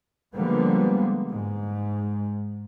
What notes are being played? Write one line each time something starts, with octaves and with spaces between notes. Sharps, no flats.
D3 F3 G3 G#3 A#3 B3
G#2